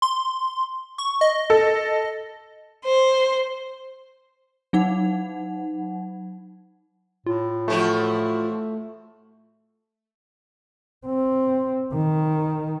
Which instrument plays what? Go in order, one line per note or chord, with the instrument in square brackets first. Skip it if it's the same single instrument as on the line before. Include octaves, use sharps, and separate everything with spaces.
[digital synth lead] C6
C#6
D#5
[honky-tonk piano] A4
[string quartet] C5
[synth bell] F#3 D#4 F#5
[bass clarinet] A2 [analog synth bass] F4
[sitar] E3 F3 F#4 [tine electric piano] A3
[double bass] C4
D#3